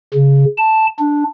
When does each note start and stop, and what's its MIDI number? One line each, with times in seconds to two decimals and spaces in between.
0.14 0.45 49
0.58 0.86 81
0.99 1.24 62